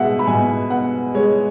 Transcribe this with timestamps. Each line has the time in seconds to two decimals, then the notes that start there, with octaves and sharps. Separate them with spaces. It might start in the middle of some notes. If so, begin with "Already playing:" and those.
Already playing: B2 G#3 E5 F#5
0.19 B5
0.27 B2 G#5
0.70 B3 F#5
1.14 G#3 C#5